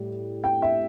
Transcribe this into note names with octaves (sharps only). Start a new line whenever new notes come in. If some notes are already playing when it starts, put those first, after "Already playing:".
Already playing: A2 G3
G5
E5